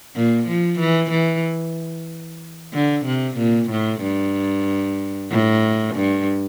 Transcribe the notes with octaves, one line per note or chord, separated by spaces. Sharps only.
A#2
F3
E3
E3
D3
C3
A#2
A2
G2
A2
G2